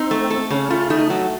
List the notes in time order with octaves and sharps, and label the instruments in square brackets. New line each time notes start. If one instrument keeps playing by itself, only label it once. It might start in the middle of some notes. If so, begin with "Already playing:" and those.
Already playing: [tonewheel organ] C4 [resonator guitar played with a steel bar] D#4
[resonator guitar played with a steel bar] A3
A4
[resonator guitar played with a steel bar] C#3 [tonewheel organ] C#4
[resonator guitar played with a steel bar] A3 [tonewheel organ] F4
[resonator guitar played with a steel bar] A3 [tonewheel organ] D#4
[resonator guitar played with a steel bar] F#3